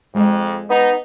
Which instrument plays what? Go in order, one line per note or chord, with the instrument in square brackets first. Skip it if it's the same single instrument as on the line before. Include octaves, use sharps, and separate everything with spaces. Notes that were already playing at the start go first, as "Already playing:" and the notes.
[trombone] F2 [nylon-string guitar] G#3 D#5
[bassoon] B3 [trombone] D#4